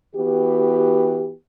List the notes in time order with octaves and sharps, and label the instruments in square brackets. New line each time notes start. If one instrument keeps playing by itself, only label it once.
[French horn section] E3 B3 F#4 G4